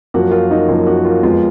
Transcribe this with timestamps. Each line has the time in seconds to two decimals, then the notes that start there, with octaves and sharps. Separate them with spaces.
0.14 F#2 F3 A#3 F#4
0.31 F4
0.51 D#4
0.68 F#2 F3 A#3 F4
0.86 F#4
1.04 F4
1.23 F2 F3 G#3 B3 F4